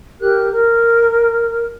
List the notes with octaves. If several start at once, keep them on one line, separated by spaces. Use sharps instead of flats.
G4 A#4 F#6
A#4